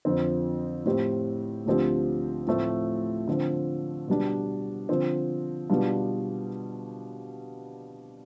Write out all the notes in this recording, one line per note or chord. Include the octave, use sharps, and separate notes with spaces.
F2 D3 F3 C4
A2 F3 C4 G4
D2 D3 F3 C4 G4
A2 F3 A3 C4
D3 F3 C4
B2 G3 D4
D3 F3 C4
B2 G3 D4 F4